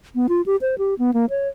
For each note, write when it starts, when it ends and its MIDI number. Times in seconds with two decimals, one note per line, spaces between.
0.15 0.27 59
0.29 0.42 65
0.46 0.56 67
0.61 0.75 72
0.78 0.94 67
0.99 1.14 59
1.14 1.26 58
1.30 1.48 73